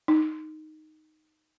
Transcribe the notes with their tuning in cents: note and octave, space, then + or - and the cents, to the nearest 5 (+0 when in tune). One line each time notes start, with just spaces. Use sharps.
D#4 +0